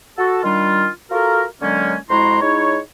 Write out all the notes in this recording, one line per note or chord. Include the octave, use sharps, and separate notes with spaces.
F#4 A4
D#3 G3 D4 F4
F4 F#4 A4 A#4
D3 F#3 G#3 A#3 C#4
F2 G#3 E4 F#4 A#5 C6
G#3 D#4 E4 C#5